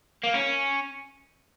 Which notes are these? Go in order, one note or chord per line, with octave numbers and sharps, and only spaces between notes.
A#3
C#4